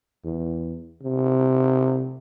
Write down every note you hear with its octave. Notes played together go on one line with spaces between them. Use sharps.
E2
C3